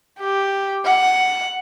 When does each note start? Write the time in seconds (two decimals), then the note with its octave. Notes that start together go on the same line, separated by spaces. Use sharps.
0.19 G4
0.84 F#5